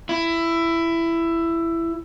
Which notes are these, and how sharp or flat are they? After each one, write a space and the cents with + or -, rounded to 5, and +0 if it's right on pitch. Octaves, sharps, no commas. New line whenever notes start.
E4 +15